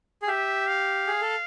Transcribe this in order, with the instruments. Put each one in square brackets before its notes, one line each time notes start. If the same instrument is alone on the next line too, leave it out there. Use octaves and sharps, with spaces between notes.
[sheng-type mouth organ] G#4
[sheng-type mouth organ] G4 [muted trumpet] E5
[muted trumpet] F5
[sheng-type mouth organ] G#4
A4